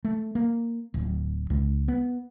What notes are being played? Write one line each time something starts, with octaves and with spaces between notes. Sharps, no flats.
A3
A#3
D1
C#2
B3